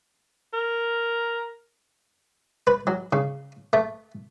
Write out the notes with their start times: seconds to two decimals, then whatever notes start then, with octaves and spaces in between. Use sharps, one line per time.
0.53 A#4
2.67 B4
2.87 F#3
3.13 C#3
3.73 A3